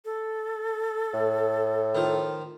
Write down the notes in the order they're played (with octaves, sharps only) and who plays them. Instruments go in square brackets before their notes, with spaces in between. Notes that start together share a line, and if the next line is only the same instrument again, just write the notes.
[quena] A4
[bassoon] A2
[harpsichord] D#3 F3